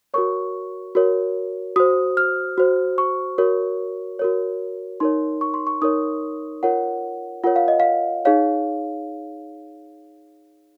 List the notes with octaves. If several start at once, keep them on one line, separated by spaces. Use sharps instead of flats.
F#4 A#4 C#5 C#6
F#4 A#4 C#5
F#4 C5 D#6
F6
F#4 C5
C#6
F#4 A#4 C#5
F#4 A#4 C#5
D#4 A#4 C#5 C6
C#6
C6
C#6
D#4 A#4 C#5 D#6
F4 A#4 C#5 F#5
F4 A#4 C#5 F#5
F5
D#5
F5
D#4 G#4 C#5 F5